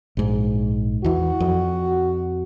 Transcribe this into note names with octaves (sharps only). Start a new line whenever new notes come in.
A#1 G#2
E2 E3 F#4
F2